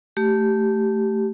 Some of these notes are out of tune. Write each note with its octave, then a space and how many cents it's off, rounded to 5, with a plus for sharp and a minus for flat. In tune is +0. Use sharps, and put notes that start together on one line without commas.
A3 +0 G4 -10